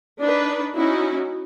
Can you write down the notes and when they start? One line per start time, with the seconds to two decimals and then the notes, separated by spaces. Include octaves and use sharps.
0.20 D4 D#4 B4
0.73 C#4 D#4 E4 F#4